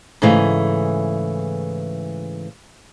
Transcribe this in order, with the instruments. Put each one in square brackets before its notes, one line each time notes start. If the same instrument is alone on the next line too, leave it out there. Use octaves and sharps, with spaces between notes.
[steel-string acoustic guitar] G#2 C#3 E3 A3